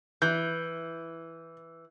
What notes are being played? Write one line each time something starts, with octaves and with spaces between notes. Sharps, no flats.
E3 G6